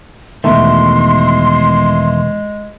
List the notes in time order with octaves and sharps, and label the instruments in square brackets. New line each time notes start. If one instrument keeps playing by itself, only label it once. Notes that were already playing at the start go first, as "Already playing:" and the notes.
[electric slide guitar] E2 B2 D#3 [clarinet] G#3 [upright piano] A3 [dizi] C6